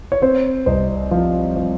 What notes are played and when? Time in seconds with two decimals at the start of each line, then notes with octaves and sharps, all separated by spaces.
0.12 C#5
0.22 C4 C5
0.66 C2 C5 D#5
1.11 F3
1.56 F3